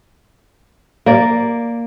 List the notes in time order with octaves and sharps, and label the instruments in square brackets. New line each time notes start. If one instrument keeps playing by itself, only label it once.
[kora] A#3 D5